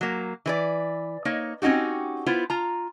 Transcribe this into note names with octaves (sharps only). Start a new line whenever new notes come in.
F#3 A#3
E3 B4 D5
A#3 D#4 C#5
C4 C#4 D#4 F#4 G4
B3 E4 F4 C5
F4 A#5